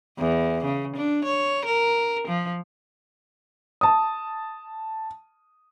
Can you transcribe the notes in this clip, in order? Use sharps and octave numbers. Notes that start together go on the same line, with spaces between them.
E2
C#3
D4
C#5
A#4
F3
A5 D#6